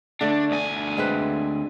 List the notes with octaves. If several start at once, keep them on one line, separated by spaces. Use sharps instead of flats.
D3 A3 D4
D2 G#5
G#3 C4 B4